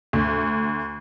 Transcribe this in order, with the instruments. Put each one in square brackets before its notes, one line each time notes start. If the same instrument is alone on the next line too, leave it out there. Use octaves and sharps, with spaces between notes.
[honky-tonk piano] D2